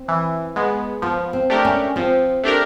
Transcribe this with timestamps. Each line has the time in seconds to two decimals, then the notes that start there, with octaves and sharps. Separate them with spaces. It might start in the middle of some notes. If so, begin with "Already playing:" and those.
Already playing: C4
0.08 E3
0.56 G#3 B3
1.02 F3 B3
1.33 C4
1.50 A3 D4 G4 A#4
1.65 C#4
1.96 F3 C4
2.44 A3 D4 G4 A#4